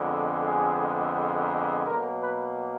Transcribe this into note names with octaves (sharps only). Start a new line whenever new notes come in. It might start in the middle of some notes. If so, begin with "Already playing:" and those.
Already playing: F2 D3 G#3 B3
G#4
B2 F#3 A#3 A#4
B4